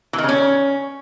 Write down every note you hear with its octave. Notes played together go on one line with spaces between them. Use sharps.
E3
D#3
C#3
C#4